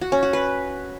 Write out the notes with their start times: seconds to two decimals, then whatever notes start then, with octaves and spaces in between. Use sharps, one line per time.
0.01 F#4
0.12 C#4
0.23 F#4
0.33 B4